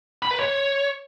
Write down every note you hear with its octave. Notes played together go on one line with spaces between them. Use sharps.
B5
B4
C#5